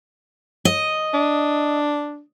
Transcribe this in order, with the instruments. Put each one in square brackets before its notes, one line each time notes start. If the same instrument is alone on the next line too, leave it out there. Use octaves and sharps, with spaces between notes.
[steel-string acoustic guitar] D#5
[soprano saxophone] D4